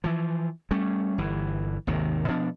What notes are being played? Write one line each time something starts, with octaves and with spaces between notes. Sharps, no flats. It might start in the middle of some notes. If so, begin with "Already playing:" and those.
E3 F3
G3 A3 C#4
G1 E3
G#1 D#2 C3 D#3
B2 F3 D4